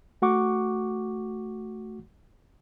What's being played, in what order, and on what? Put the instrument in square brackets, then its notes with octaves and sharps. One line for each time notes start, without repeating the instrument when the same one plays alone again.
[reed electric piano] A3 F#4 F#5 C#6 D6